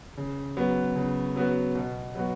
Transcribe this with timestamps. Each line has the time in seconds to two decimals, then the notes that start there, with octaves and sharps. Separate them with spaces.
0.17 C#3
0.57 F#3 B3 F#4
0.96 C#3
1.36 F#3 B3 F#4
1.75 B2
2.15 F#3 B3 F#4